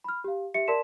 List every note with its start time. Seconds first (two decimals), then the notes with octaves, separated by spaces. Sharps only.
0.04 B5 F6
0.24 G4 F5
0.54 G4 E5 C#7
0.68 A#4 D5 A5 C6 B6 E7